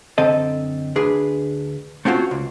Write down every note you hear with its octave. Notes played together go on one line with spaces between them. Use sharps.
F#2 D3 C4 A4 D#5
D2 D4 G#4 B4
A3 C4 C#4 F4 F#4
C#2